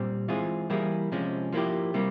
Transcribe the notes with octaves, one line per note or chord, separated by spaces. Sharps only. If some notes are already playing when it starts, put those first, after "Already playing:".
Already playing: A#2 G3 C4
E3 G#3 C4 F4 G#4
E3 G3 A#3 E4 G#4
C3 F3 G#3 C#4
F3 A#3 E4 G4
C3 G3 A#3